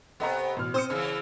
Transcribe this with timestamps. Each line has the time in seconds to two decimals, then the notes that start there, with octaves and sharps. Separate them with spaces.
0.20 C3 B3 A4 D#5 A#5
0.57 A1 B2 F6
0.74 C4 C5 D#6 C#7
0.90 C#3 E3 F6